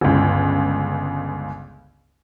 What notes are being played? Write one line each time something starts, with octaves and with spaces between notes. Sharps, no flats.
G1 C#2